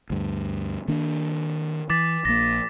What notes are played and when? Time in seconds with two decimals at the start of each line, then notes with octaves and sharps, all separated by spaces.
0.10 D2 G2
0.88 D#3 A#3 D4
1.90 E3 D6 A6 B6
2.25 A#1 A#3 A#6